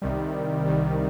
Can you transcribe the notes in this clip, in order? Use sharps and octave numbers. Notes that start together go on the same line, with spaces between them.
C2 C3 D#3 G3
C2 C3 D#3 G3